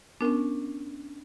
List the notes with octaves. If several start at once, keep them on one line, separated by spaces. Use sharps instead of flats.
B3 C#4 D4 A#4